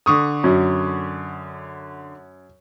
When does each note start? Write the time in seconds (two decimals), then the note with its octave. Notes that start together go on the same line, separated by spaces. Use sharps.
0.06 D3 C#6 D#6
0.44 F#2